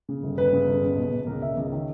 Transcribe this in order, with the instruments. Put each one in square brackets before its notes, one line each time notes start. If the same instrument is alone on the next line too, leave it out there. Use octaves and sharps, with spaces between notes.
[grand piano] C#3
G1
G1 B4
C#3
G1
C#2
B2
B2
C#2 A#4
B2 E5
C#2
D#3